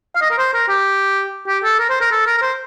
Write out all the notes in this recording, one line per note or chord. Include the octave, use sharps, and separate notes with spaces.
F5
D#5
A#4
C5
A#4
G4
G4
A4
A#4
C5
A#4
A4
A#4
A#4
C5